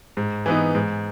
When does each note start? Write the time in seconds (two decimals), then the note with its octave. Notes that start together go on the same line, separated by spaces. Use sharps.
0.17 G#2
0.46 E3 B3 D#4
0.75 G#2